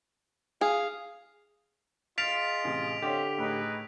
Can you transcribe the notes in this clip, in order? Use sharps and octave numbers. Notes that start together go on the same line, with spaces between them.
G#4 F5
F4 G#4 D#5 F5 A6 B6 D7 F7
A1 C3
D3 C4 G4 C#5 D#5 F5
A2 D#4 G#4 B4